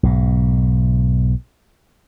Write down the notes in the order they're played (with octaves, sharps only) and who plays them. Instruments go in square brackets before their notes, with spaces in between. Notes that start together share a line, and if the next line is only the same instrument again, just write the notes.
[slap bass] B1 G#2